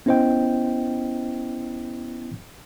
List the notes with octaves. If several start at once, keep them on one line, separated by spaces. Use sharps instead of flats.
B3 C#4 E4 C5 D#5 G5